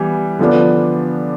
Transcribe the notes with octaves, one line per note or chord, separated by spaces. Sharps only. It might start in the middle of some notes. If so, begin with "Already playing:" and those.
Already playing: E3 G3 B3
D3 F3 B3 D4